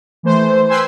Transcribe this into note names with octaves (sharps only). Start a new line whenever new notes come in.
E3 A3 C5
B4 C5 G5 G#5 C6 E6